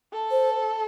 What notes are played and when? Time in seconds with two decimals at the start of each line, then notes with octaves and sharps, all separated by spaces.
0.13 A4
0.31 C5